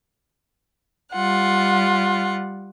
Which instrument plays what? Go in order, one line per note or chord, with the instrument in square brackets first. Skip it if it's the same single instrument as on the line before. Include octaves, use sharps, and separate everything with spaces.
[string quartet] G3 F4 F#5